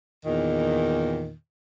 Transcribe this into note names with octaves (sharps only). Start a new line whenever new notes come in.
E2 A#2 D#3